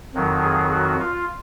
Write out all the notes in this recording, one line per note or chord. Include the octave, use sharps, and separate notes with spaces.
F2 D#3 F#3
G#4
F#4
F4